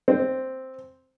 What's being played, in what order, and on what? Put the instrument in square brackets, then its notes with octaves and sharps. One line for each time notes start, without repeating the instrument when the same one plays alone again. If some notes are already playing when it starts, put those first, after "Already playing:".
[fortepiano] C4